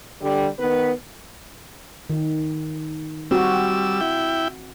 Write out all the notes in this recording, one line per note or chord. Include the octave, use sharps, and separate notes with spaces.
D3 G3
D#3 B3 B4
D#3
G3 C4 F#4 E6
E4 G5